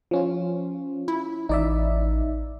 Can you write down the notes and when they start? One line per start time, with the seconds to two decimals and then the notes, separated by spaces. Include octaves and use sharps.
0.11 F3 C#4 F4
1.08 E4
1.49 A1 D#4 D5 E5